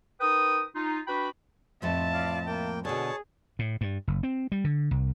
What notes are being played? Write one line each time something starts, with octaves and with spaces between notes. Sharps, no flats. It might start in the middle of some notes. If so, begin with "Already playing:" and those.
D#4 A#4 B4 G5 D#6
D#4 F4
D4 F#4 B4 G5 B5
F2 A2 F3 E5 A5
F4 D5 F5
A#3 G5
B2 D3 G#4 C#5 A5
A2
G2
F#1
C4
G3
D3
C2